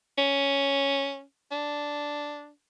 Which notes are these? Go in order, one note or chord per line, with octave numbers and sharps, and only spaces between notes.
C#4
D4